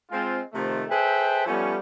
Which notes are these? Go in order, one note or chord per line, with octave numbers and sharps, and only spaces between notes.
G#3 C4 F4
C3 D#3 F3 A3
G#4 A4 B4 C5 E5 G5
F3 G3 A3 B3 C#4